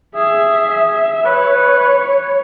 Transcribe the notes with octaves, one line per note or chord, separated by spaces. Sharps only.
G#4 E5
E5
B4 C#5